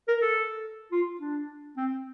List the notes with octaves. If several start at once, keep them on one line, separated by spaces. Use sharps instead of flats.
A#4
A4
F4
D4
C4